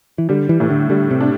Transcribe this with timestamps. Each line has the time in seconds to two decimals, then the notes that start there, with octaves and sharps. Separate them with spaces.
0.18 E3
0.29 D3 G3
0.49 E3
0.60 A2 E3
0.70 D3
0.90 D3 G3
1.11 C3
1.20 D4